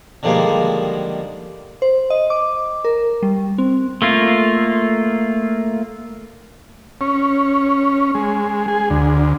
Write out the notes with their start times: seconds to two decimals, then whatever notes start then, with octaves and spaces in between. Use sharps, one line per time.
0.23 D3 D#3 F3 G3 G#3 A#3
1.82 C5
2.10 D#5
2.30 D6
2.85 A#4
3.23 G3
3.58 C4
4.02 A3 A#3 F4
7.01 C#4
8.14 G#3
8.68 G#4
8.90 D2